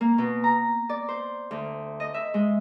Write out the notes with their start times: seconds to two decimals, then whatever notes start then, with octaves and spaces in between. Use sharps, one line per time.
0.01 A#3
0.18 B2
0.44 A#5
0.89 D5
1.09 C5
1.51 D2
2.00 D#5
2.14 E5
2.34 G#3